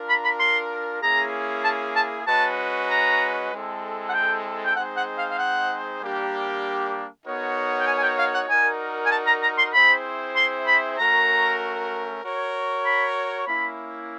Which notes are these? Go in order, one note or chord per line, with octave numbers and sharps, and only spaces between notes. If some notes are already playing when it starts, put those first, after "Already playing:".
Already playing: D4 F4 A#4
B5
B5
C6
A#3 C#4 E4 G#4 A#5
A5
A5
G#3 C#4 F#4 B4 D#5 A5
A#5
G#3 C4 E4 A4
F#5
G5
G5
G#3 C4 D#4 G#4 C5 F#5
F#5
F5
F5
F#5
G3 A#3 D4 G4 A#4
B3 D#4 F#4 A#4 C#5
G5
G#5
G#5
G5
F5
F#5
D#4 F#4 A#4 D5 G#5
G#5
A5
A#5
A#5
C6
C4 E4 G#4 C5 E5 B5
C6
B5
A3 C#4 F#4 A#4 A#5
F#4 A#4 C#5
B5
A#3 C#4 E4 B5